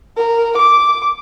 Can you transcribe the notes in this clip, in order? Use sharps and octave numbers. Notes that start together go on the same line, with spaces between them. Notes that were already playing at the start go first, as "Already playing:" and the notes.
A#4
D6